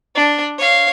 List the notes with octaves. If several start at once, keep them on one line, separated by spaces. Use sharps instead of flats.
D4
C#5 F5